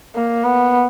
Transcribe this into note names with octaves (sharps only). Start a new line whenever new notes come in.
A#3
B3